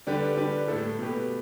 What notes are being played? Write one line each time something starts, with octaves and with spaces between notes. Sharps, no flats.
D3 G3 D4 G4 B4
D3 G3 D4 G4 B4
A2 A3 E4 A4
B2 A3 G4 B4